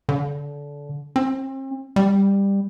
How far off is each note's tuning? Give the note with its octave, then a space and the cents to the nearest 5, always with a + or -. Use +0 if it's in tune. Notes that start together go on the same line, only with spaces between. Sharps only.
D3 -25
C4 +40
G3 +15